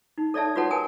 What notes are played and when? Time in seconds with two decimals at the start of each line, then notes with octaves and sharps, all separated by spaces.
0.18 D#4
0.34 A4 C#5 D5 E5 A5
0.56 F4 F#4 B4 C#5 F#5 A5
0.71 A#4 G#5 A5 D#6